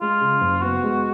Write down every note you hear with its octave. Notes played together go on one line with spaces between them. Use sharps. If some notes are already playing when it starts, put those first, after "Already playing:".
G#3 F4
C#3
F#1
B3 F#4
G#3